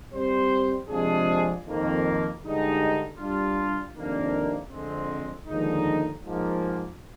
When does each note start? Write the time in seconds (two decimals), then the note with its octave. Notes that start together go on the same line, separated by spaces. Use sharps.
0.13 G3 C4 G4 C5
0.88 C3 F3 G#3 D4 G#4
1.65 F2 D#3 A#3
2.42 G2 D3 G#3 D#4 G4
3.17 G3 D4 F4
3.93 F2 C3 D#3 A#3 D4
4.69 F2 D3 G#3 C4
5.46 D#2 D3 F3 G#3 D#4
6.22 G#2 F3 A#3